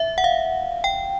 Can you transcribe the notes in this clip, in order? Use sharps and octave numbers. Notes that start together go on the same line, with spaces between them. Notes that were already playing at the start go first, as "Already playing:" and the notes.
Already playing: E5
F#5
F5
G5